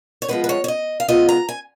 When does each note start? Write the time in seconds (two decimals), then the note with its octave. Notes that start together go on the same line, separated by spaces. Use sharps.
0.22 C#5
0.28 F3 G#3 B3 B4
0.44 B4
0.49 C#5
0.64 C#5
0.68 D#5
1.00 F5
1.08 C#3 G#3 B3 F4 D#5
1.29 A#5
1.49 G#5